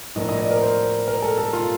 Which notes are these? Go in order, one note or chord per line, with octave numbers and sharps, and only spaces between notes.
A2 F3 A#3 D4 D#5
D#5
D5
A#4
C5
A#4
A4
A4
F4